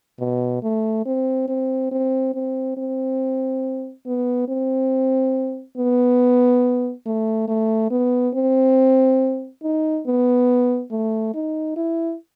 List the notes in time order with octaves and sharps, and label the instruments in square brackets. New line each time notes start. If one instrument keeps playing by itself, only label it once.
[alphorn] B2
A3
C4
C4
C4
C4
C4
B3
C4
B3
A3
A3
B3
C4
D#4
B3
A3
D#4
E4